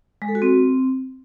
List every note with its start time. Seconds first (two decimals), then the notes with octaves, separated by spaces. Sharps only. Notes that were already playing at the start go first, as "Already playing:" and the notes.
0.22 G#3
0.28 A4
0.35 F#4
0.42 C4